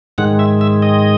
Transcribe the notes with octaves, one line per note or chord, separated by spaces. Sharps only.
G#2 D#3 G#3 F#5
E5
E5
D#5